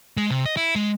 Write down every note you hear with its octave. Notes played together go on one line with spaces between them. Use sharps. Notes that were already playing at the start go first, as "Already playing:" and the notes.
G#3
C3
D#5
E4
G#3